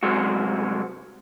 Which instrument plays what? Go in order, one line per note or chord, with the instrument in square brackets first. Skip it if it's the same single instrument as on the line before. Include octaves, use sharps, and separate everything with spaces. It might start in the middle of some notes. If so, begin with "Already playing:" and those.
[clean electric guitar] C2 F#2 G#3 C4 F#4